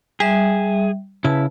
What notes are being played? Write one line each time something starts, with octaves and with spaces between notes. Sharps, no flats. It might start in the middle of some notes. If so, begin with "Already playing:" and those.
G3 G#4 E5
C#3 E4 B4 A5